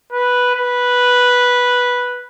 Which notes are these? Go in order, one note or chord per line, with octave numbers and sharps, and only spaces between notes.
B4
B4